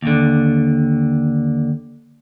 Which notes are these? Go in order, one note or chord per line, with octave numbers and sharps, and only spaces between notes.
D#2 D3